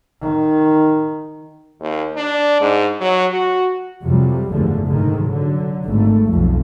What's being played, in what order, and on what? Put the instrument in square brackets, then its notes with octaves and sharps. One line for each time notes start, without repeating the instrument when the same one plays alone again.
[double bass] D#3
[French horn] D#2
D4
G#2
F#3
F#4
[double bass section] F2 C3 F#3 G3
F#1 E2 G#2 D3 F3 A3
C2 G#2 D3 D#3
D3 F#3
G#1 A3
B1 F2